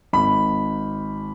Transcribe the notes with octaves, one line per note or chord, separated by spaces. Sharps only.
G#1 B5